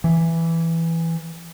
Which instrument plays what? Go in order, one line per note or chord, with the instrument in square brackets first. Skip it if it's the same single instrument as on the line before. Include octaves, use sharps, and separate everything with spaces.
[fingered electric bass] E3